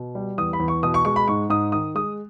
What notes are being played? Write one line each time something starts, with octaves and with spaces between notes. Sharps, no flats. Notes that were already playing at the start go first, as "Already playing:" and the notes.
Already playing: B2
G3
E2 D#6
B5
E2
C#6
B2 D#6
C#6
G#3 C#6
B5
G#2 C#6
G#2 D#6
D#3 D#6
G#3 D#6